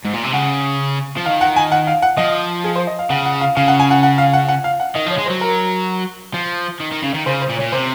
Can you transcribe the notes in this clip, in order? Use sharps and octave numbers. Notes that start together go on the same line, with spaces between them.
G#2
A#2
C3
C#3 F#5
F3
D#3 F5
F#5
G#5
F#5
F5
F#5
F3 D#5
G#4
C5
D#5
F5
C#3 F#5
F#5
F5
C#3 F5
F#5
G#5
F#5
F#5
F5
F#5
F#5
F5
F#5
D#3 D#5
F3
C#5
G#3
C5
F#3
A#4
F3
D#3
D#3
C#3
D#3
C#3 C5
C5
A#2
C#5
A#2
C3 C5